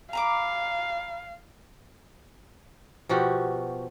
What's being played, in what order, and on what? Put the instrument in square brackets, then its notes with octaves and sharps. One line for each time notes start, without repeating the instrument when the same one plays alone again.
[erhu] F5 [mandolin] A#5 B5 D6
[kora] B2 F3 F#4 G4